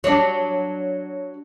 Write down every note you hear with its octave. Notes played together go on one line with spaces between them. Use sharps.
F#3 D4